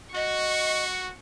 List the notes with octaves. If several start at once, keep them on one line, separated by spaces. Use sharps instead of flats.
F#4 D#5 C#6